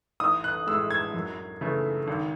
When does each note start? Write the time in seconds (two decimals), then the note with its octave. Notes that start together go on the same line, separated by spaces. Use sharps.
0.20 A1 D#6
0.44 F#6
0.67 A2 G#3 E6
0.91 G#6
1.14 F#2
1.61 C#3 E3 A3
2.08 G#1